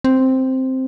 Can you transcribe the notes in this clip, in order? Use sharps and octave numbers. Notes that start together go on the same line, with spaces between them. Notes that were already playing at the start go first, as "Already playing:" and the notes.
C4